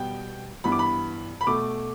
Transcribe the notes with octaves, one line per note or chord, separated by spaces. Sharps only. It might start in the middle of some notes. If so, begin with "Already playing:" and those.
Already playing: B2 G3 B3 G5
G2 E3 B3 B5
D6
B5
B5
B2 A3 D6